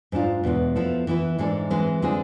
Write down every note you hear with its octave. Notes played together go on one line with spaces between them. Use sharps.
G#2 G#3 D4 F4
E2 B2 G#3 B3
F3 B3 E4 A4
E3 B3 E4 B4
G#2 E3 G#3 D4 A4
E3 G#3 C4 G#4 B4
D3 G#3 C4 G#4